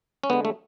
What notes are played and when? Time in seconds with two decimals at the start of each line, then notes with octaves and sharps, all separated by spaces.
0.23 C#4
0.30 D3 G#3 B3
0.45 A3